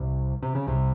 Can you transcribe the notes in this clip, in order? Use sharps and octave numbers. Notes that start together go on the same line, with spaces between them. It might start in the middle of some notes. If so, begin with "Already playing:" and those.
Already playing: C2 C3
C3
C#3
C2 C3